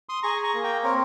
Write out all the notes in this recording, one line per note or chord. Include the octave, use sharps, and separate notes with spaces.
C6 D#6
G#4 A#5 C#6
A#5 C#6
A#3
G5 A#5
C4 A#4 C#5